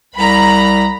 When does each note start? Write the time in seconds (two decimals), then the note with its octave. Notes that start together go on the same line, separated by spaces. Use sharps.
0.15 C2 A#5 B5